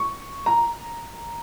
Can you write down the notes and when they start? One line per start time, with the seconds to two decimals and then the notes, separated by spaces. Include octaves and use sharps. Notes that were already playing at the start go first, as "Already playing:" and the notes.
Already playing: C#6
0.46 A#5